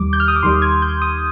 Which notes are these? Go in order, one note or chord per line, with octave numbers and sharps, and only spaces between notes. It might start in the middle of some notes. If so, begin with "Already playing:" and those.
Already playing: D#2 D#3 G3 D6
G6
F6
D#6
D6
D#2 D#3 G3 C6
G#6
G6
D#6